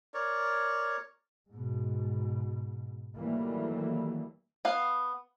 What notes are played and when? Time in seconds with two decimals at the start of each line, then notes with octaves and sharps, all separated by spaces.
0.14 A#4 C#5 D5
1.50 G#2 B2
3.16 D#3 E3 F#3 G3 A3 A#3
4.65 B3 F5